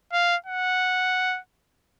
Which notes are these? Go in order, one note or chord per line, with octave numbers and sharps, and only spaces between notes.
F5
F#5